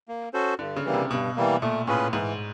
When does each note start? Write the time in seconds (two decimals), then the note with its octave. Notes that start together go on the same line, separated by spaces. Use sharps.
0.08 A#3
0.34 C#4 F#4 A4 C5
0.59 G2 D3
0.76 C#3
0.85 E3 G3 A#3
0.94 C3
1.10 G2 B2
1.36 E3 G3 A#3
1.61 A#2 A3
1.87 A2 C#4 F4 G#4 B4
2.13 G#2 E3